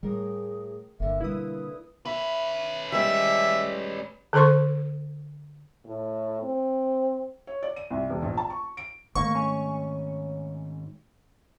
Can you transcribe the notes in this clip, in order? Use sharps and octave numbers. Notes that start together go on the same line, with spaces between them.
A2 G3 G#4 A#4
G1 D3 A#3 E5
B2 G3 E4 B4 D#6
C#4 B4 E5
G3 G#3 D5 E5
D3 A4 C5 C6 C#6
A2
C4
C#5
D5
D#7
C2
E1
A#1
A5
C#6
D7
G#2 D#3 A3 A#3 C#6
C#4